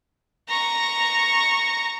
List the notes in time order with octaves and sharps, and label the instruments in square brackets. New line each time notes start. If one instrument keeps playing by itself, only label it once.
[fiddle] A#5 C#6